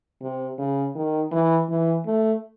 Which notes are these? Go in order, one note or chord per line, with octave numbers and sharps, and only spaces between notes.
C3
C#3
D#3
E3
E3
A3